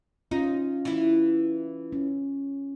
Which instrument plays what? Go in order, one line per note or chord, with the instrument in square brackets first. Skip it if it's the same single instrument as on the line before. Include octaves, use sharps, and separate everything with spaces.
[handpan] C#4 F4 [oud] D#4
[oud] E3 E4
[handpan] C#4